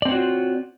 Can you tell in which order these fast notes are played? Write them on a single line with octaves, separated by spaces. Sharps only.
D5 C4 C#5 F#4 F4